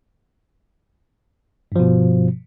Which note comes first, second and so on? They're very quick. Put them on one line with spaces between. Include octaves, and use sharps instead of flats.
G2 F3 B2